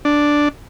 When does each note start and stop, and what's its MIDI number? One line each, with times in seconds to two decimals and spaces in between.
0.05 0.49 62